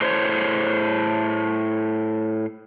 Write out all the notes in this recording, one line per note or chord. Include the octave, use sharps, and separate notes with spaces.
A2 C5 C#5